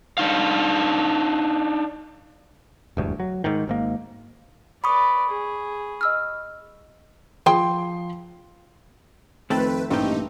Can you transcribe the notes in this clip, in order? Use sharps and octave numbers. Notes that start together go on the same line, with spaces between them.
D4 D#4 F5
E1 D2 G2
F#3
G#2 D#3
G#1 G#2 A#3
B4 D5 B5 C#6 D#6
G#4
D#5 E6 F6
F3 G#4 C5 G5 C6
F2 D#3 A3 C4 A4 B4
A1 G2 A#2 A3 C4 D#4 G4